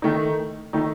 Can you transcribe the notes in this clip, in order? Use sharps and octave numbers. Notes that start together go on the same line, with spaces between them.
D#3 A3 D#4
D#3 A3 D#4